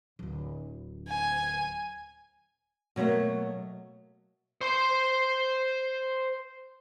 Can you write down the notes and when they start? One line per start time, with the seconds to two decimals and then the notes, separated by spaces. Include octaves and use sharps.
0.19 D1 D2
1.08 G#5
2.96 B2 F#3 G3 A3 A#3
4.61 C5 C6